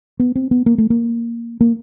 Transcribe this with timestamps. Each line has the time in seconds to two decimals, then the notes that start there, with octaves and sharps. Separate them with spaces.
0.20 B3
0.35 C4
0.51 B3
0.66 A#3
0.78 A3
0.90 A#3
1.61 A#3